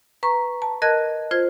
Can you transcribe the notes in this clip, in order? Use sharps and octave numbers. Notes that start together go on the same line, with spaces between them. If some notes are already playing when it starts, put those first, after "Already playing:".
B4 A#5 C#6
A5
A#4 D#5 A5 F#6 G#6
F4 C5 G#6